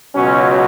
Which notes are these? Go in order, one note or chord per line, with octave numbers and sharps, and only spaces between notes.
C#2 B2 F#3 C#4